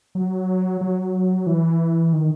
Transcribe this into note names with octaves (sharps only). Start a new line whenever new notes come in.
F#3
F#3
E3
D#3